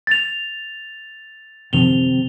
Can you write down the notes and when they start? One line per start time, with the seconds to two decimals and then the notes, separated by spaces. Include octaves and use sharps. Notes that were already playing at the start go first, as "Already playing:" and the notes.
0.07 A6 F7
1.73 F#2 C3 D#3 F3 F7 G7